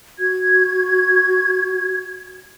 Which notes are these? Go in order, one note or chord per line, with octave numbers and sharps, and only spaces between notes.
F#4 G#6